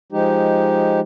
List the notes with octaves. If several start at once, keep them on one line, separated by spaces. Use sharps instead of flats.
F3 G#3 D#4 G4